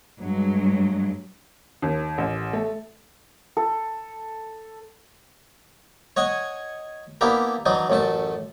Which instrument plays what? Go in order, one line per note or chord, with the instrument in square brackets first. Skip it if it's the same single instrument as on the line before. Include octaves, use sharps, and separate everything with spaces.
[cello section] G2 F#3 G#3
[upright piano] D#2
A1
A3
[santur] A4
[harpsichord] C#5 D#5 F#5 G#5
A#3 B3 D4 E4 G4 A#4
E3 F#3 D4 D#4
A1 F#2 A3 A5